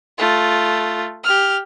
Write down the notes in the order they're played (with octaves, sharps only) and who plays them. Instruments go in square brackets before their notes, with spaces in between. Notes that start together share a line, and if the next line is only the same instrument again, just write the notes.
[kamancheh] A3 F4
G4 F6